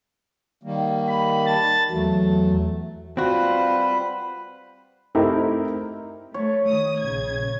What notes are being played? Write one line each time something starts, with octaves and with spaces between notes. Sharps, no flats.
D#3 G3 A#3
B5
A5 A6
E2 F#3 A3
G3 C4 F4 F#4 B4 C5 B5
A3 C4 D#4 E4 G4 A#4
A3 C#5
D#3 D#6
A#1 C#3 G#6